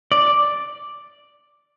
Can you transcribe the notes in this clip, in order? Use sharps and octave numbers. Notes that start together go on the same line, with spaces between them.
D5